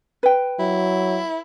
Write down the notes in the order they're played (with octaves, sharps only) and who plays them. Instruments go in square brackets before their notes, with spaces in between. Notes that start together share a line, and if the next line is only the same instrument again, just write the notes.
[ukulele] B4 G5
[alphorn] F#3 [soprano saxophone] E4